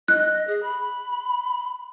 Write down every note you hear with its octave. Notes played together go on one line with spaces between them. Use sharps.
D#5 F#6
G#4
B5